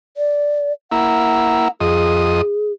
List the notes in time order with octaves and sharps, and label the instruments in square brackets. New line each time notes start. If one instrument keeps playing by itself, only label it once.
[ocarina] D5
[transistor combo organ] A#3 E4 [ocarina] F#5
[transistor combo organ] F2 D#5 [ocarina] G#4